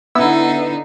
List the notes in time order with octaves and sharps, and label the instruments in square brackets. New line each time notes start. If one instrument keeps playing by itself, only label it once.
[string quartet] D3 D#4 [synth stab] B3 E4 E6